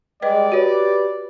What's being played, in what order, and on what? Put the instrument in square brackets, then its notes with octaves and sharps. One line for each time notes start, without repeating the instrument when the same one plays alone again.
[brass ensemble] G3 G#3 [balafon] B4 D#5 [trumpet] D5 [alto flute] G5
[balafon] F#4 C#5 [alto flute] G4 [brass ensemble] B4